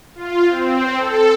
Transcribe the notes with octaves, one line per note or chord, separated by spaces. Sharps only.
F4
C4
A4